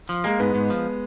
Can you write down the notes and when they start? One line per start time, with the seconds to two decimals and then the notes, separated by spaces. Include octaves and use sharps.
0.09 F3
0.24 G#3 A#3
0.39 G#2 B3
0.54 G#2
0.70 F3